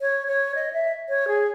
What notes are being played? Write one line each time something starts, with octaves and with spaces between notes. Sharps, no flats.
C#5
C#5
D#5
E5
C#5
G#4